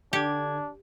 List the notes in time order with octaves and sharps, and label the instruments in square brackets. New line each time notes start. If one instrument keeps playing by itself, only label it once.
[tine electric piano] D3 G#6 [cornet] D4 [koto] G4